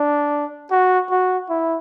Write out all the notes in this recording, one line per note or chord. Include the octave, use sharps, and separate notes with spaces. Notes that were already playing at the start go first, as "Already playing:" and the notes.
Already playing: D4
F#4
F#4
E4